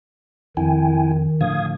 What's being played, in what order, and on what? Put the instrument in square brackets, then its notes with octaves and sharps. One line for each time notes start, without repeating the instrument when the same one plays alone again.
[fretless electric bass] F2 [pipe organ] D#3 [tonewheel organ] E4 G5 G#5
[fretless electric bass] A2 D3 F3 [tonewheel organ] F5 D#6 G#6